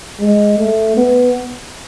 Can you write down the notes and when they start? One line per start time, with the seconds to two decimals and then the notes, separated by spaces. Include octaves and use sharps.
0.20 G#3
0.59 A3
0.97 B3